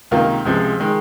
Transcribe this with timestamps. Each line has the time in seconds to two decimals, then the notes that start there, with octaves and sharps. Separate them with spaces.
0.11 C#2 C3 D#3 A#3 F4
0.45 C#2 C3 F3 G#3
0.80 D#3 G#3